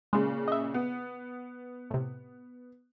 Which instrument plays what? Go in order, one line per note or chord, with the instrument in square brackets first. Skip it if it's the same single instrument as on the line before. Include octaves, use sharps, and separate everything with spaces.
[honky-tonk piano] A#2 C#3 [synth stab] G#3
[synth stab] D#5 E5
[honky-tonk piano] B3
[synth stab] A2 C3